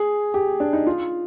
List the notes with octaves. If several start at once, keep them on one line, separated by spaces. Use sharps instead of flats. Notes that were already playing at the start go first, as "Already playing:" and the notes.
Already playing: G#4
G4
D4
D#4
F4